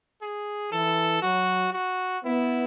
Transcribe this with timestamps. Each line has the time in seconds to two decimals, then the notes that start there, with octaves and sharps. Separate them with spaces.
0.21 G#4
0.72 E3 A4
1.22 F#3 F#4
1.73 F#4
2.24 B3 E4